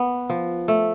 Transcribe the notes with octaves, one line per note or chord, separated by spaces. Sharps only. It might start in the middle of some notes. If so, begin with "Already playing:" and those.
Already playing: B3
F3
A3